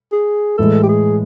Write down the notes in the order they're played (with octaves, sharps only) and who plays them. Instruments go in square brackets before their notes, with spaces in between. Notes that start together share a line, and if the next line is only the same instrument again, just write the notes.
[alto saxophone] G#4
[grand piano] A2 E3 G#3 [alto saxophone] A4
[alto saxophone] G4
G#4